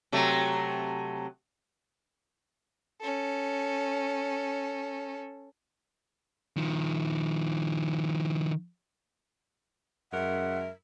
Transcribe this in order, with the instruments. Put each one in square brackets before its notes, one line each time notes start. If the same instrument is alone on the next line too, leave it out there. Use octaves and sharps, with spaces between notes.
[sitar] C3 F#3 A3
[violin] C#4 A4
[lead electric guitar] D#3 F3
[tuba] F#2 [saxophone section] C#3 G#3 A#4 [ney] E5 [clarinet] F#5